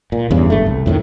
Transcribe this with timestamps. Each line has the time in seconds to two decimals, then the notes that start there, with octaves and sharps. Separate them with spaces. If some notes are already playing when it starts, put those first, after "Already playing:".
0.12 A#2
0.31 E2 G2 C#3
0.50 G#1 G2 A3
0.66 C2
0.86 F2 A2 C3 D#3